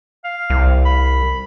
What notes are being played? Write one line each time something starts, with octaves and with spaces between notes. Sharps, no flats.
F5
C2
B5